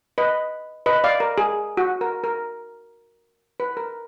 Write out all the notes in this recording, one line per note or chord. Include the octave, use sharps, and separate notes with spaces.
B4 D#5
B4 D#5
D5 F5
A#4
G#4
F#4
A#4
A#4
B4
A#4